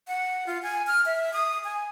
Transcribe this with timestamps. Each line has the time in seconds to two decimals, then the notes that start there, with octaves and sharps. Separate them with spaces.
0.08 F#5
0.46 F4
0.63 G#5
0.87 F6
1.06 E5
1.33 D#6
1.64 G#5